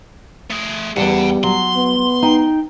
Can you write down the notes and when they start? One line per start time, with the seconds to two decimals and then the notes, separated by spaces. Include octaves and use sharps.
0.51 A3 G#4
0.97 E2 G#2 G3 F#5 A5
1.44 F#3 C6
1.76 B3
2.23 D#4 G5